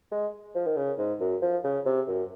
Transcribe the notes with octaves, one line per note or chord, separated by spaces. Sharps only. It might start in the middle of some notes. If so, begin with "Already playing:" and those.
G#3
F3
D#3
C#3
G#2
F#2
F3
C#3
C3
F#2